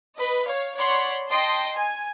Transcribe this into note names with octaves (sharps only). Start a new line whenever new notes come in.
B4 D#5
C#5 F5
C#5 D5 F#5 B5 C6
D#5 G5 A5 C6
G#5